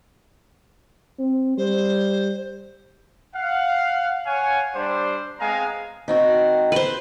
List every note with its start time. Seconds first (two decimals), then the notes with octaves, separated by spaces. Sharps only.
1.19 C4
1.58 G3 C5
3.35 F5 F#5
4.25 C#5 F5 F#5 G#5
4.74 G3 D4 C5
5.40 G#3 B3 C4 F5 G#5 A#5
6.08 D#3 C4 F#4
6.72 B4 C5